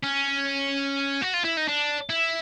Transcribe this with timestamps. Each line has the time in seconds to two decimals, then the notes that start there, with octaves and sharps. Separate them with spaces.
0.04 C#4
1.22 F#4
1.33 F4
1.44 E4
1.57 D#4
1.68 D4
2.10 E4